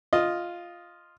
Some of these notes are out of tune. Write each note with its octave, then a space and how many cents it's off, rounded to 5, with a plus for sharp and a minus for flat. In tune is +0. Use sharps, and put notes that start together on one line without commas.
F4 +0 D#5 +0